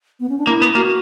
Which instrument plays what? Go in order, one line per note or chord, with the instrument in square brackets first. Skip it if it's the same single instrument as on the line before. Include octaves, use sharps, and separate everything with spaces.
[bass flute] B3
C#4
D4
[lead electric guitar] A#3 [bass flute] E4
[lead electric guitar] B3
[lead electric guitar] A#3 [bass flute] F#4